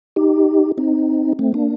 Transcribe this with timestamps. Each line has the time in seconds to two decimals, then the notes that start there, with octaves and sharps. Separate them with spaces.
0.16 D#4 G4
0.78 C4 D#4
1.39 A3 C4
1.54 A#3 D4